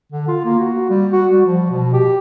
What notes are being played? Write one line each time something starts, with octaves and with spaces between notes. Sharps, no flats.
D3
F4
A#3
F#4
G3
F#4
G3
F3
B2
G4